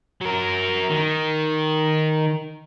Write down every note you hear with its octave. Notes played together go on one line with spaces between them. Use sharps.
F#3 A#4
D#3